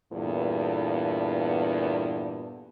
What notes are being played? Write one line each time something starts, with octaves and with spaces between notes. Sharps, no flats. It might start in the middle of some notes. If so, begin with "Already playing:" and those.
E2 G2 A#2 B3 A4